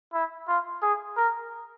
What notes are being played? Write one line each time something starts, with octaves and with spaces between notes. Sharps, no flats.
E4
F4
G#4
A#4